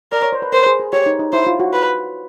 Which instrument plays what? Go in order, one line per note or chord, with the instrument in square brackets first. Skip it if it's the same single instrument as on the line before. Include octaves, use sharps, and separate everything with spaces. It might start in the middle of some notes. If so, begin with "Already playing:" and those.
[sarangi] A#4 [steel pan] D5
[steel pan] C#5
C5
B4
[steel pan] A#4 [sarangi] C5
[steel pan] G#4
G#4
[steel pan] G4 [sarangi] C#5
[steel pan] D#4
D#4
[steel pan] E4 [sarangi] C5
[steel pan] F4
F#4
[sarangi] B4